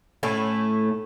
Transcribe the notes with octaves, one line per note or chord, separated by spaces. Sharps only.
A2 A3 C#4 E4